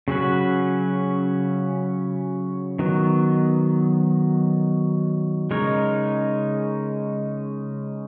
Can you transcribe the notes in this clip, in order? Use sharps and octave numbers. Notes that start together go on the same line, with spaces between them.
C#3 F#3 C#4 F#4 B4
D#3 F#3 B3
C#3 G#3 D#4 A#4 C#5